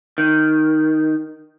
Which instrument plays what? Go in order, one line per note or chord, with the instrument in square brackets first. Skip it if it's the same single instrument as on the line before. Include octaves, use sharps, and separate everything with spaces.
[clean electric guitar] D#3